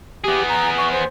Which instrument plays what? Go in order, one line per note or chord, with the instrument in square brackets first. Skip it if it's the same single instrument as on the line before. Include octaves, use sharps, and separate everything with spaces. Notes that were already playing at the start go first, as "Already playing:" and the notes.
[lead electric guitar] B3 G#4 [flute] G4
[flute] A#5
C#6
C5